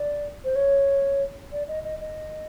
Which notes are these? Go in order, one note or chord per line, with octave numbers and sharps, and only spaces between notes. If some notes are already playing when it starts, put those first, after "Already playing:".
Already playing: D5
C5
C#5
D5
D#5
D#5
D#5